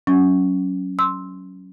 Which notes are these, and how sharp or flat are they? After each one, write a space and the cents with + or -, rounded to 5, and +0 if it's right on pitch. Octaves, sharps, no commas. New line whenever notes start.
F#3 +10 C#4 +0
C6 +5 E6 -10